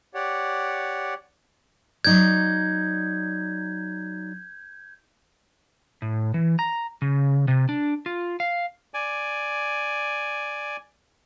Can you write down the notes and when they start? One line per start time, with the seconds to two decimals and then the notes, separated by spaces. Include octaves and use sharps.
0.14 G4 C#5 D5 F#5
2.04 F#3 D#4 D5 G6 G#6
6.02 A2
6.34 E3
6.59 A#5
7.02 C#3
7.48 C3
7.69 D4
8.06 F4
8.40 F5
8.94 D5 G#5